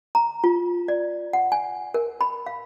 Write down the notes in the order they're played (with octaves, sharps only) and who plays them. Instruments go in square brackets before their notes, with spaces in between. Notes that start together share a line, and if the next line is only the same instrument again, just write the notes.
[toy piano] A#5
F4
D5
F#5
G#5
A#4
B5
F5